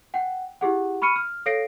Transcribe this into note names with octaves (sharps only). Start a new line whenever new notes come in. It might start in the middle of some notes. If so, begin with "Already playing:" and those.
F#5 G5
E4 G4 G#4 F#5
B5 C#6 F6 C#7 D#7
F6
A4 C#5 F5 A#6 C7 D7